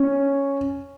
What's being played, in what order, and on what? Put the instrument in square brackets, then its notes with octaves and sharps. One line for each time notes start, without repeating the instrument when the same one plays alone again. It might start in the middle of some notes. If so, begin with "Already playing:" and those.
Already playing: [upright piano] C#4